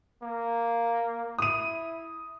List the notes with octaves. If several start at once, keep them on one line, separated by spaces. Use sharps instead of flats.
A#3
E4 D#6 D#7